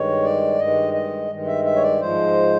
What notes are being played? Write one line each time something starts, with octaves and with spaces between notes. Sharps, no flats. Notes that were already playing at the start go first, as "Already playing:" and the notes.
Already playing: G2 D#3 G#3 C#5
D5
G2 D#3 G#3 D#5
D#5
G2 D#3 G#3
E5
E5
C#5
D5
G#2 F3 G#3 C5